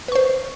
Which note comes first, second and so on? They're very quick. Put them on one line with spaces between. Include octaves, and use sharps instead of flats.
B4 C#6 C5